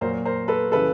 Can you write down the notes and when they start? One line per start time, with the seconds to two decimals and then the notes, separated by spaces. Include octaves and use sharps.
0.01 A#2 F#3 A#4 C5
0.25 A#4 C5
0.48 A4 B4
0.72 C#3 E3 G3 A4 B4